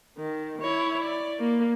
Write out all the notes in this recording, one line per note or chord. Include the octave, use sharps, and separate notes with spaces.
D#3
E4 C#5
D5
A#3